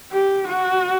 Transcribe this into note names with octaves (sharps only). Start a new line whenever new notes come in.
G4
F#4